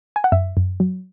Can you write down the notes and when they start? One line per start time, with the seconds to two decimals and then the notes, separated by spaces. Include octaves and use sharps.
0.16 G#5
0.24 F#5
0.32 F#2 E5
0.57 F#2
0.80 F#3